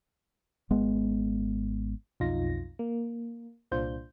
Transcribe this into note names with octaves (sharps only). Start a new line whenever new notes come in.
G#1 G#3 B3
B1 F2 B2 D#4 F4 A#6
A#3
C2 A#2 D4 F4 C5 G6